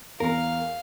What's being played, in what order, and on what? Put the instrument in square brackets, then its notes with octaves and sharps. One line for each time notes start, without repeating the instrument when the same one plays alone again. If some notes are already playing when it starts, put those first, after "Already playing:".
[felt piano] E2 [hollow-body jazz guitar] A#4 [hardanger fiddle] F5